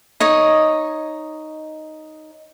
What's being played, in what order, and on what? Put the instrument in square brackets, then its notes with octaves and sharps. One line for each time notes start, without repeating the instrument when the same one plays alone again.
[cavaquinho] D#4 C#5 D#5